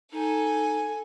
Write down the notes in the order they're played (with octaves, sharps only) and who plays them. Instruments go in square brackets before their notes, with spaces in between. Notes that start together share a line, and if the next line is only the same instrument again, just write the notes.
[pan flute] D#4 [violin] A4 G#5